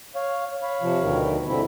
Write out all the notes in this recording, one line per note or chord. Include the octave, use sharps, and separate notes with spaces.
C#5 F5
C#5 F5 B5
C3 F3
D2 B2 D#3
G#2 D3 E3 F3 C4 E4